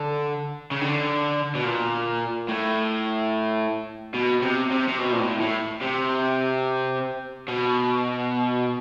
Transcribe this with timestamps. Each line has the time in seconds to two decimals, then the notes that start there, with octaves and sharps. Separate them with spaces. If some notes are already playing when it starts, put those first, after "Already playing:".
Already playing: D3
0.71 C#3
0.81 D3
1.55 B2
1.65 A#2
2.49 A2
4.14 B2
4.42 C3
4.70 C3
4.88 C3
4.98 B2
5.12 A#2
5.20 A2
5.40 A2
5.81 C3
7.48 B2